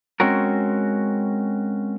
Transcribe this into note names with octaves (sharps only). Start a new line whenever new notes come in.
G#3 C4 C#4 F#4 A#4